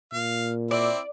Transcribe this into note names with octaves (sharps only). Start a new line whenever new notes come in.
A#2 F5
C4 E4 D5